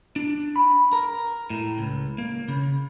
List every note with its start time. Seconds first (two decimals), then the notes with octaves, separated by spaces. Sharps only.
0.16 D4
0.56 B5
0.93 A#4
1.50 A2
1.78 C#2
2.18 A#3
2.48 C#3